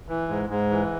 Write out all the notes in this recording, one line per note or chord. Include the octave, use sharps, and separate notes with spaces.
E3
G#2
G#2
E3